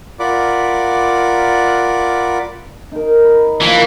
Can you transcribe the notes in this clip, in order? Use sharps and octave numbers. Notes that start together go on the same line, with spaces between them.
F4 A#4 D5 F#5 B5 D6
D#4 A#4
B5
E3 F3 A#3